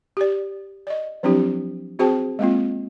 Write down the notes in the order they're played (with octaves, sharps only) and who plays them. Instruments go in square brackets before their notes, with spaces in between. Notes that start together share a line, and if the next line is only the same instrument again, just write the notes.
[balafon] G4 D5
D5 D#5
F3 F#3 C4 D4 E4 G4
C4 F#4 G#4 C5 G5 A5
G#3 A#3 C4 F4